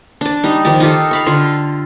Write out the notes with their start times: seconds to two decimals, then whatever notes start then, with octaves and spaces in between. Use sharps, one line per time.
0.21 D4 D5
0.44 G3 D#4
0.65 D#3 F3 G4 D5
0.80 D#4 F4 G4 A4
1.11 F5 B5 C#6
1.26 D3 F4 C6